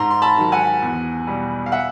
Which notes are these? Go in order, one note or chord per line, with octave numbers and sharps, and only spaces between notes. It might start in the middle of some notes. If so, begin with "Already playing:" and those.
Already playing: G#2 A#5 C6
C6
A5 B5
D#3 F#3
F#5 G#5
E2
B2 G3
F5
E5 F#5